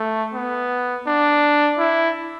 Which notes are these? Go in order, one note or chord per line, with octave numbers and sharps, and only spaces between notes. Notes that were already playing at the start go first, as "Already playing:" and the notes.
Already playing: A3
B3
D4
E4